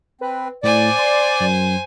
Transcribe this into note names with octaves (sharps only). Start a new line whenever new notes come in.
C4 B4
A2 C5 D5 G#5
C6
F#2